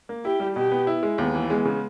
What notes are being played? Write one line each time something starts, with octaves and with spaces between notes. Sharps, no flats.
A#3
E4 G4
G3
B2 G4
B3
E4
G#3
D#2 B3
E3
G#3 B3
C#3